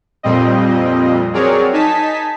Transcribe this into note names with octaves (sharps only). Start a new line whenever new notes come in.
F2 A#2 G3 C4 D#5
F#3 C4 G#4 A#4 C#5 D5
D#4 G#5 A5 B6